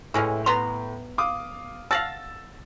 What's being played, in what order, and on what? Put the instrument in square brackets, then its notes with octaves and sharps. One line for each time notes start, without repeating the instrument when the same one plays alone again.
[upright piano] A2 [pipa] E3 G#3 C#4
[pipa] B3 A#5 C6
[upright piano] F5 D6 D#6
[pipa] F5 F#5 A5 [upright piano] E6 A6 A#6